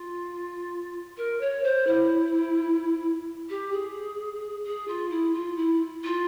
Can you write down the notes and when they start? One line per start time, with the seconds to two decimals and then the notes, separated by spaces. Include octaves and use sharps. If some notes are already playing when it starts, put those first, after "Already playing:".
Already playing: F4
1.17 A#4
1.40 C#5
1.64 C5
1.87 E4
3.49 G4
3.72 G#4
4.64 G#4
4.87 F4
5.10 E4
5.34 F4
5.56 E4
6.03 F4